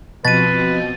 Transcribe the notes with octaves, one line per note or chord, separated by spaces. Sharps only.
B2 F3 C4 B4 A6 D#7